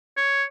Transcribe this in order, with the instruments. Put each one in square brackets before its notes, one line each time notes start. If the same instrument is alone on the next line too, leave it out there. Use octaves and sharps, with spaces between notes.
[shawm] C#5